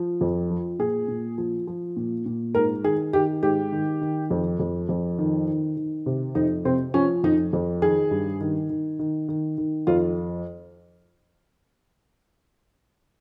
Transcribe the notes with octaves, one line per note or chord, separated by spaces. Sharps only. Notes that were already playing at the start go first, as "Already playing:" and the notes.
Already playing: F3
F2
F3
A#2 G#4
A#2
F3
F3
A#2
A#2
G#2 A#4
D#3 G#4
D#3 G4
G#2 G4
D#3
D#3
F2
F2
F2
D#3
D#3
D#3
C3
F2 D#4
C3 C4
F3 C#4
F2 D#4
F2
D#3 G#4
G2
D#3
D#3
D#3
D#3
D#3
F2 F4